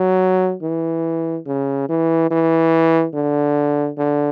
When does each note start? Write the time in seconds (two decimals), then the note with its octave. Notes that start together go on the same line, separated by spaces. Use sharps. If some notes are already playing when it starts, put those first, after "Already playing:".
Already playing: F#3
0.63 E3
1.47 C#3
1.89 E3
2.31 E3
3.14 D3
3.98 D3